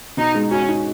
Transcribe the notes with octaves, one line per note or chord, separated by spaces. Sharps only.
B2 D#4
G#3
C#4 F#4
D#4